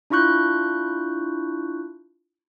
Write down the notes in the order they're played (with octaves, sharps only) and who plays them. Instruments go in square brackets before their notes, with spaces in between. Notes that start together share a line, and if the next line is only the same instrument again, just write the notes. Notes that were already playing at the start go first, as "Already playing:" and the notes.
[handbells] D4 E4 F4 C#6 F#6 G6